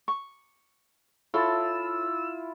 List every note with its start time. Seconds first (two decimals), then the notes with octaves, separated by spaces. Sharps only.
0.08 C#6
1.34 E4 F4 A4 C#5 A5 E6